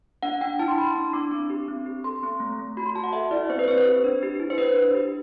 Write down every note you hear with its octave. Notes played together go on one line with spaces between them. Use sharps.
D4 F#5
D4 G5
E4 A5
C6
E4 B5
D4
D4 D6
C4 D6
G4
C4
G4
A4 C6
C4
A3
A3
F#4 B5
C6
F#4 A5
F#5
A4 E5
E4 D5
C4 C5
B4
C4 C5
B4
G4
D4
G4
E4
C5
D4 B4
D4
G4